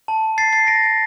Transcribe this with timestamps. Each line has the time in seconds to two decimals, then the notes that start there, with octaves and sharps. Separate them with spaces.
0.08 A5
0.38 A6 C7
0.53 A6 C7
0.67 A#6 D7